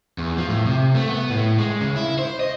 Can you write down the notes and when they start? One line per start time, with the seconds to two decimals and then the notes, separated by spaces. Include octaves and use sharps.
0.18 E2
0.38 F3
0.49 A2
0.65 C3
0.95 A3
1.09 B3
1.30 A2
1.59 G#3
1.81 C#3
1.96 E4
2.19 C5
2.40 D#5